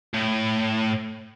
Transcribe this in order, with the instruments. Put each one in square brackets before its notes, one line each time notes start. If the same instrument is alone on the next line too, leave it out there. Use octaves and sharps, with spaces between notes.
[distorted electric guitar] A2